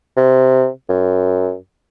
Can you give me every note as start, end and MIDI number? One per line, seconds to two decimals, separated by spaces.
0.17 0.68 48
0.89 1.55 42